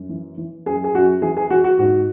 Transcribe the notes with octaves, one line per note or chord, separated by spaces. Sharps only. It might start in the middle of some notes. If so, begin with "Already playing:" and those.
Already playing: F#2
E3
E3
F#2 G#4
G#4
F#2 F#4
E3 G#4
G#4
E3 F#4
F#4
G#2 F#4